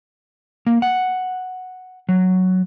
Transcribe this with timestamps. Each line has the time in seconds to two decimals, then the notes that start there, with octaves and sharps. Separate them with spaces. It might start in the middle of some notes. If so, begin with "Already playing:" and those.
0.67 A#3
0.82 F#5
2.09 F#3